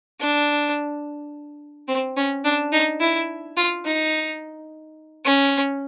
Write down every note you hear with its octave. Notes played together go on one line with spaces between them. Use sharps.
D4
C4
C#4
D4
D#4
E4
F4
D#4
C#4